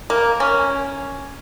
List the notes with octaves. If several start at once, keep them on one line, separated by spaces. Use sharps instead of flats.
A#3
C#4